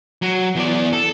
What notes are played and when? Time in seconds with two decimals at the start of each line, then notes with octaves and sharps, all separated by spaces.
0.22 F#3
0.55 E2 D5
0.93 A4